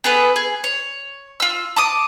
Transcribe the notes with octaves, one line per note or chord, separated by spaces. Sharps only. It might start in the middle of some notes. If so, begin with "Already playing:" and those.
B3 G#4 A4 B4
G#4
C#5
F4 E6
A5 D6 D#6